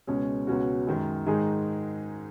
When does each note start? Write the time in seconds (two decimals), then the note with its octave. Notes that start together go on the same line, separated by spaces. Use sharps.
0.07 C#2 B2 G#3 C#4 G#4
0.47 C#2 B2 F#3 C#4 F#4
0.87 F#2 D#3 G#3
1.26 G#2 D#3 G#3 D#4 G#4